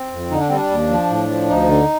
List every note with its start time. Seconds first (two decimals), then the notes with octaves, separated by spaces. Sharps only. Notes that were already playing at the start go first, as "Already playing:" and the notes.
Already playing: C4
0.12 F2
0.31 D3 D#4
0.39 D4
0.48 G3 C4
0.56 D4
0.70 D#2
0.90 F3
1.10 A2
1.29 F3
1.49 D2 D#4
1.68 D3